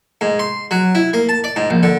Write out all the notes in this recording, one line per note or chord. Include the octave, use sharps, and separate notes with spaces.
G#2
C6
F#3
E4
A#3
A5
D5
G#2
A#1
D3